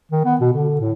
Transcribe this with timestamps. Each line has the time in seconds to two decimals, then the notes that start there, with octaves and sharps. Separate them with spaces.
0.12 D#3
0.25 B3
0.41 B2
0.53 D3
0.81 A2